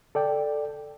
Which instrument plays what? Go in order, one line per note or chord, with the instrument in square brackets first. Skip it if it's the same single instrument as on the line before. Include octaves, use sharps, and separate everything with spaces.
[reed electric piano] A4 D5 G5